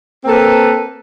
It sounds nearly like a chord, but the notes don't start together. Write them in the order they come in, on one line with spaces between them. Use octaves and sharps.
C4 A#3 A4 B4